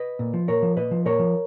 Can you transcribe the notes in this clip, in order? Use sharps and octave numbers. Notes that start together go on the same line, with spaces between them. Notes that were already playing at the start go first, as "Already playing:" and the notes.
Already playing: B4 D#5
A#2
F3
A#2 A#4 C#5
F3
A#2 B4 D#5
F3
A#2 A#4 C#5
F3